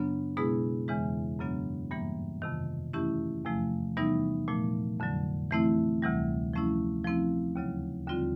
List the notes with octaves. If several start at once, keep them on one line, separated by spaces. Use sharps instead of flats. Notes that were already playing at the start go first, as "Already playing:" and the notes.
Already playing: F#2 C#3 F#3 B3 D4
B2 G#3 B3 E4 G#4
E2 C#3 E3 G#3
F#2 C#3 F#3 B3 D4
G2 E3 G3 A#3
F2 C3 D#3
E3 A3 C#4 E4 G4
E2 C3 F3 A3
C3 E3 G3 B3 D#4
A#2 F3 A3
F2 D3 F#3
E3 A3 C4 E4
D2 C3 E3 G3
F3 A3 C#4 E4
F3 A3 C4 E4
D#2 C#3 F#3
D#2 D3 G3 C4 F4